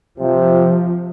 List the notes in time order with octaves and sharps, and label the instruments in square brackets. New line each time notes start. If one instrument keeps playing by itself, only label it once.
[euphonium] C3 [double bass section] F3